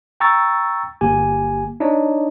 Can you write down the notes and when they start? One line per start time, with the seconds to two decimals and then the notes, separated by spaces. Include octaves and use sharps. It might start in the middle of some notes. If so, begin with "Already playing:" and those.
0.20 G5 A#5 C#6 E6 A6
1.01 G1 A#3 G4 G#5
1.80 D4 D#4 C#5 D#5